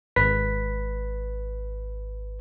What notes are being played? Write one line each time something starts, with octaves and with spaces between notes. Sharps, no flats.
G#1 B4 B6